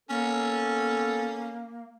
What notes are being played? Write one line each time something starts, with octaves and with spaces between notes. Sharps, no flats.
A#3 B3 C#4 A4